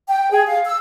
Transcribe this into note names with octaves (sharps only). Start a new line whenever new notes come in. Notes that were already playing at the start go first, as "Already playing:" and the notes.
G5
G#4
F5
E6